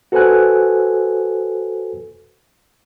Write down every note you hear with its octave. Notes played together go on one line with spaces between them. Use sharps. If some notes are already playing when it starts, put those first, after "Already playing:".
F#4 A4 B4 C5 G#5 F#6